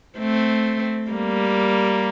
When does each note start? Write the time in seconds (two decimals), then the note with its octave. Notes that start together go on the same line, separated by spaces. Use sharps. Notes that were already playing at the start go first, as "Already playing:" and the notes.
0.19 A3 C4
1.11 G3 A#3